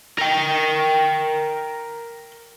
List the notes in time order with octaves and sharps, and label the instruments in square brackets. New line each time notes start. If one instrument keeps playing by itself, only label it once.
[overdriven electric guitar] A#4 G5